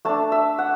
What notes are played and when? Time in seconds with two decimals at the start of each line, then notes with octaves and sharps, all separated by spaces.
0.05 A3 D4 A5
0.32 E5
0.59 F#5